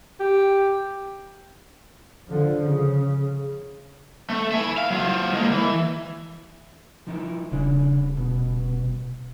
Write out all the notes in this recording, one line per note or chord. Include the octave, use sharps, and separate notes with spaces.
G4
D3 F3
C#3
A3
E5 G#5
F5
F#3 F4
G#3 A#3
E3
F3 D#4 E4
D#1 C#3 D4
B2